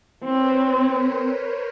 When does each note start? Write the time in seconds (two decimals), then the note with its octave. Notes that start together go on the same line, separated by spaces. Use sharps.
0.25 C4 B4 C#5
0.57 B4 C#5
0.90 A#4 C5